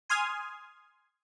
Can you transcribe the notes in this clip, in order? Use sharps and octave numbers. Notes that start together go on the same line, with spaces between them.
G#5 C6 D#6 F6 G#6